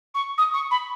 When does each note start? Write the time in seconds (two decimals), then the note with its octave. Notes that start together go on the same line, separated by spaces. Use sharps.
0.15 C#6
0.38 D#6
0.54 C#6
0.71 B5